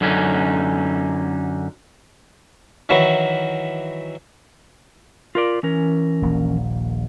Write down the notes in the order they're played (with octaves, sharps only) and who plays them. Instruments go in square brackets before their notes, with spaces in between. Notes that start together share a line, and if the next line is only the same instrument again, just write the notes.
[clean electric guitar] F#2 D3 C#4 D#4
[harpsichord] D#3 E3 F#3 E4 F#4
[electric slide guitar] F4 A#4 D5
E3 C#4 A#4
[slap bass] D#1 A#1 A#3